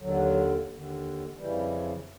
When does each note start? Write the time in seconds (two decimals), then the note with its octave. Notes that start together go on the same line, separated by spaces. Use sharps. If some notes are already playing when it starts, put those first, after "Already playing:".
0.01 D#2 D3 F#3
0.70 D#2 D3
1.38 F2 C#3 E3 G3